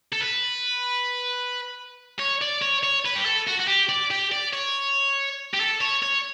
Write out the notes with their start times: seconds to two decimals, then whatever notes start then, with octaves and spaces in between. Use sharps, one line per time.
0.13 A4
0.21 B4
2.20 C#5
2.41 D5
2.62 C#5
2.83 C#5
3.05 B4
3.15 G4
3.25 A4
3.48 F#4
3.60 F#4
3.68 G4
3.89 D5
4.11 G4
4.32 D5
4.53 C#5
5.53 G4
5.60 A4
5.81 C#5
6.03 C#5